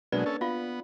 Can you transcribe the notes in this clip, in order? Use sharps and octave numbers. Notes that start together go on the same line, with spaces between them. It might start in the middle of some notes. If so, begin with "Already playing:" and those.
B2 F#3 G#3 A#3 D4 B4 D5
C#4 A4
B3 F4 F5